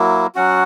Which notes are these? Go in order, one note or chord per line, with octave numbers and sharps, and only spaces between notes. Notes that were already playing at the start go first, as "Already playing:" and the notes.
Already playing: F#3 A#3 E4
F#3 C#4 F#4 F#5